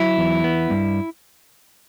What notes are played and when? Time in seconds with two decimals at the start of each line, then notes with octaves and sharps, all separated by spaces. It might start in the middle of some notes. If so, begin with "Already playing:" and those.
Already playing: F#3 E4
0.18 E2
0.44 B3
0.70 G2